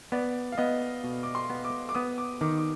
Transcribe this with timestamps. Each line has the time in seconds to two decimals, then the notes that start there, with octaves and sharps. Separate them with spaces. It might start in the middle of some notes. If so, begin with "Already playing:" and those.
0.12 B3 D5
0.52 F5
0.58 B3 D#5
1.04 B2
1.23 D6
1.35 C6
1.50 B3
1.65 D6
1.89 D6
1.95 B3 D#6
2.18 D6
2.41 D#3 D6
2.58 D6